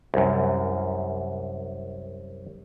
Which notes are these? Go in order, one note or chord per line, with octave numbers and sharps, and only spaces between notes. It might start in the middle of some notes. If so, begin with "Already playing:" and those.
C2 F#2